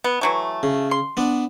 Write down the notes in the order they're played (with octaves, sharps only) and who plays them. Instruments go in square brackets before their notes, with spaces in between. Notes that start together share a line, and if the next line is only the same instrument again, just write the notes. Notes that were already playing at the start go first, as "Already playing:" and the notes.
[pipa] B3
E3 F#3 A3
[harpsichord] C#3
[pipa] C6
[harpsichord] B3 D4